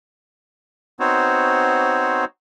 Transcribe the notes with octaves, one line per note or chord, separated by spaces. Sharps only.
B3 C4 D#4 F#4 C5 C#5